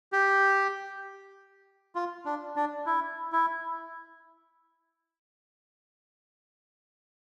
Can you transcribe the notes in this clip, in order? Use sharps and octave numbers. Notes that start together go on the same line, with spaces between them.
G4
F4
D4
D4
E4
E4